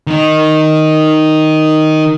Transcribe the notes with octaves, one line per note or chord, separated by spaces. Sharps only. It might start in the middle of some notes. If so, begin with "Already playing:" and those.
D#3 D#4